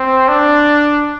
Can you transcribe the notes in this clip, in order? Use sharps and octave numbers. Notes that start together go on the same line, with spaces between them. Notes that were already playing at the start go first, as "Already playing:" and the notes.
Already playing: C4
D4